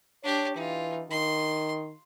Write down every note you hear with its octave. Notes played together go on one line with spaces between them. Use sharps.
D4 G4 C#5
E3 D#4 F4
D#3 C6